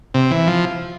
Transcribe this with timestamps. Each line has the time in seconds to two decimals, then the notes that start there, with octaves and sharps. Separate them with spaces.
0.14 C3
0.31 E3
0.47 F3